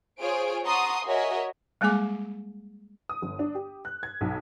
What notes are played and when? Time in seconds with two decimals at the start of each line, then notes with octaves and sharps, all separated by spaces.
0.20 F4 G#4 C5 C#5 D7
0.66 F#5 A5 A#5 C6 C#6 D#6
1.05 F#4 G#4 A#4 C#5 D#5 E5
1.81 G3 G#3 A#3 G#4 G#5 D6
3.09 D#6
3.22 G1
3.39 D4
3.55 G4
3.85 F#6
4.03 G#6
4.21 B1